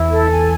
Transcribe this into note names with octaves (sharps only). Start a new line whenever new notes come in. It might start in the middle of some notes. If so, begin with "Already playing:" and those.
Already playing: E2 E3 E4
A4
G#5